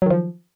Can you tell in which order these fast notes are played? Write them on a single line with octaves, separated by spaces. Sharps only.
F#3 D#3 F3